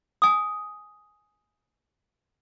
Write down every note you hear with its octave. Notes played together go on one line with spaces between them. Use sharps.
G#5 D#6